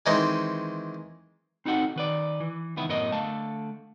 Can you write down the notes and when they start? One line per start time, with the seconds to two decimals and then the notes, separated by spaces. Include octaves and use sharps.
0.06 D#3 E3 G#3 C4 D#4
1.65 C4 D#4 F#4 A4 F#5
1.96 D#3 B4 D5
2.40 E3
2.77 C#2 D#3 B3 E4
2.89 F#2 A2 B3 A#4 D#5
3.12 D3 A3 F5 A5